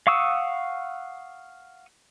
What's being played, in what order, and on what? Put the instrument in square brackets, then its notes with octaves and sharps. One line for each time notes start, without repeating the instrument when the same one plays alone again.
[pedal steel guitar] F5 F#5 C#6 D#6 E6